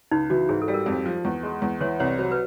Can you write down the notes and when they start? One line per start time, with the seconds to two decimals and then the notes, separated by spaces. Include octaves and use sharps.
0.11 C#2 D#4
0.30 E3 F#4
0.49 G#2 G#4
0.62 A4
0.68 G3
0.74 A#4
0.86 F2
1.06 F3
1.25 E2
1.43 G#3
1.62 E2
1.81 E3 C#5
2.00 C2 C#5
2.19 F#3 C5
2.32 B4